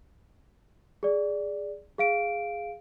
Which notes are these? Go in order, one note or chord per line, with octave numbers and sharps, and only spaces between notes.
G#4 D5
G#4 F5 D7